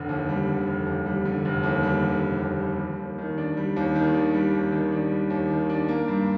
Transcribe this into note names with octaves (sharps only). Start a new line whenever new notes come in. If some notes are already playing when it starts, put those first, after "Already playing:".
Already playing: F1 D3
D#2
G3
D3
F1
D#2
G3
D3
F1
D#2
G3
D3
F1
D#2
G3
G3
D#2
D#3
D4
G3
D#2
D#3
D4
G3
D#2
D#3
D4
G3
D#2
D#3
D4
A#3
G2